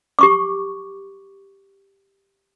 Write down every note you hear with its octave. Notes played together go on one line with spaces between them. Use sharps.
G4 C#6 D6